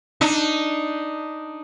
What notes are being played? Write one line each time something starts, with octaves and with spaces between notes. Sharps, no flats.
D4 D#4